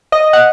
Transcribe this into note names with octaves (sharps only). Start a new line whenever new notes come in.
D#5
F#5